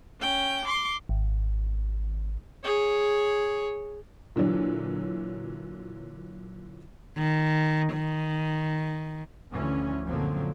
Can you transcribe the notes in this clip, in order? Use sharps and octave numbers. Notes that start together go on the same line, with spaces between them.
C#4 G5
C6 D6
G#1
G#4 C#5
A#2 D3 E3 F#3
D#3
D#3
D2 D3 E3 F3 C#4
F#1 A#2 D3 F3 F#3 C4